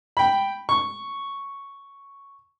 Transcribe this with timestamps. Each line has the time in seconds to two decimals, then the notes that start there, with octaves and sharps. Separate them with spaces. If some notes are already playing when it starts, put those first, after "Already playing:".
0.17 G5 B5
0.69 C#6